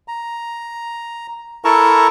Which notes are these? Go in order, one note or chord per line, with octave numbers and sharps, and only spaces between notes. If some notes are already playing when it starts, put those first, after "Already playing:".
A#5
E4 A4 A#4 A5 A#5 C#6